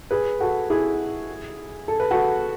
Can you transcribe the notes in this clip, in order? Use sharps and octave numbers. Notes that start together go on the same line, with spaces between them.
G#4 B4
F#4 A4
E4 G#4
A4
B4
F#4 A4